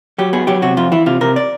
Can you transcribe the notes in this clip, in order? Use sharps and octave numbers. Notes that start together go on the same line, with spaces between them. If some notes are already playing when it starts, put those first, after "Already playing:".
F#3 G4
B3 G#4
F#3 G4
C3 F#4
F2 F4
E3 E4
C3 F4
C3 A#4
D5